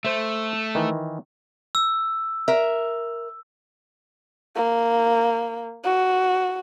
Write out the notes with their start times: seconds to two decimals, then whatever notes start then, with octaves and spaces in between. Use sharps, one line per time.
0.05 A3 C5 E5
0.75 D#3 E3
1.75 E6
2.48 A#4 E5
4.56 A#3
5.84 F#4